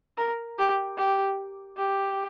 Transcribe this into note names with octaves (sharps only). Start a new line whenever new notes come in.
A#4
G4
G4
G4